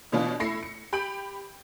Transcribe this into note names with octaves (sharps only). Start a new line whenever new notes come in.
B2 E3 B3 C#4 D4 F4
A3 E4 B5 A#6 C7 C#7
C#7
G4 B5 G6 D7 F#7